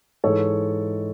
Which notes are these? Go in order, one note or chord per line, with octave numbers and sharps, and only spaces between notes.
G#2 E3 G#3 A4 C#5